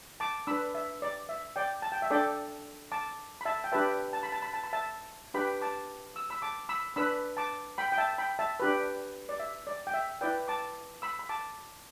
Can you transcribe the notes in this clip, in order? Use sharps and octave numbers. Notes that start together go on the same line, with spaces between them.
A5 D6
D4 B4 B5 E6
E5
D5
E5
D5 G5
A5
G5
E5
D4 A4 D5 G5
A5 D6
B5
E5 A5
G5
D4 G4 B4 E5 A5
A5
B5
A5
B5
A5
B5
E5 A5
D4 G4 B4 G5 B5
A5 D6
E6
B5 E6
A5 D6
B5 E6
D4 B4 B5 E6
A5 D6
G5 B5
G5
E5 A5
G5 B5
E5 A5
D4 G4 B4
D5
E5
D5
G5
E5
E4 B4 D5 G5
A5 D6
B5 E6
B5
A5 D6